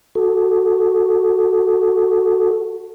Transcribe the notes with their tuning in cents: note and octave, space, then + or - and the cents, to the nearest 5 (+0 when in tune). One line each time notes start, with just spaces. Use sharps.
F#4 +0 A4 +0